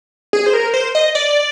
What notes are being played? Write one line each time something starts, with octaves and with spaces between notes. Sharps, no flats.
G#4
C5
A#4
C5
D#5
D5